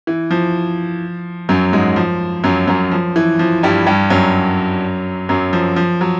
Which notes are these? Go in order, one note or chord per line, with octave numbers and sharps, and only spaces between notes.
E3
F3
F#2 F#3
G#2 G#3
F3
F#2 F#3
F#2 F#3
F3
E3
F3
G2 G3
G2 G3
F#2 F#3
F#2 F#3
F3
F3
F#3